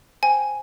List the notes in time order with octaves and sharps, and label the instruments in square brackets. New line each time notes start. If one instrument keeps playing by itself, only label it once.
[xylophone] C5 G5 G#5